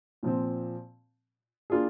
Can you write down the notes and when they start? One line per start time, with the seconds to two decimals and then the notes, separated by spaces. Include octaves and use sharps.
0.23 A#2 F3 C4
1.70 A#3 D4 F4 G#4